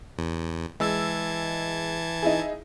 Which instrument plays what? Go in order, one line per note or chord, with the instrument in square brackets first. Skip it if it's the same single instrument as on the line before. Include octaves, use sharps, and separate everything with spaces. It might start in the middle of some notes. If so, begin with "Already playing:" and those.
[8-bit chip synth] E2
[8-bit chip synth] E3 A5 G#6 [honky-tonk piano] G#3 E6
[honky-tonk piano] D#4 E4 G#4